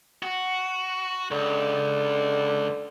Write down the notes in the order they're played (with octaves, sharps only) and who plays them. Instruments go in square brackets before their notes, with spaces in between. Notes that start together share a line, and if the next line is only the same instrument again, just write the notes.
[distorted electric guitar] F#4
[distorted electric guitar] C#2 [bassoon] D3